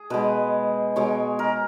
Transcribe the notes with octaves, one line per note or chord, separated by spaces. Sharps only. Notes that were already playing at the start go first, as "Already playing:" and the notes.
Already playing: G#4
B2 G#3 B4
B2 G#3 C#5
A#4